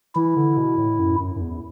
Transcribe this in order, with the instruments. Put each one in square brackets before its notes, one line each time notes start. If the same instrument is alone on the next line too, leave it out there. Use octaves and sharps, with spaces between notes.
[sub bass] E3 [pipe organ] E4
[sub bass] D3
B2
A2
F#2
F#2
F#2
E2